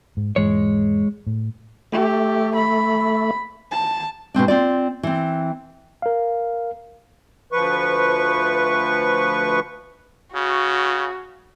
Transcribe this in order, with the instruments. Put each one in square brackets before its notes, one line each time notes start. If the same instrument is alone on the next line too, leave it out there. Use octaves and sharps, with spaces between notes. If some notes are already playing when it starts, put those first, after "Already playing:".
[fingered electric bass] G#2
[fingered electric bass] E1 G#2 E3 [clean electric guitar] G#3 C#5
[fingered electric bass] A2
[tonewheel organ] A3 [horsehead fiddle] G4
[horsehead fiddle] B5
A5
[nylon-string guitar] B2 G#3 C4 D4
C4 F4 D5
E3 C4
[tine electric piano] A#4 F5
[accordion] D2 F3 B4 C#6
[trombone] C#3 [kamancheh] F#4